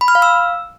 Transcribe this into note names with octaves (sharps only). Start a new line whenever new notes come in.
B5
F6
F5
E6